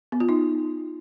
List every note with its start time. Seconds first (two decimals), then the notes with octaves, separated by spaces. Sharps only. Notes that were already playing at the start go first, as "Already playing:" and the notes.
0.12 B3
0.20 F4
0.29 D#4